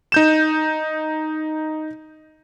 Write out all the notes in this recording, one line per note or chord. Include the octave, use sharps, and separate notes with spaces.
D#4 G6 E7